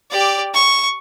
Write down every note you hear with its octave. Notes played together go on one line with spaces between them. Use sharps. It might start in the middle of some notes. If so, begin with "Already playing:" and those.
G4 D5
C#6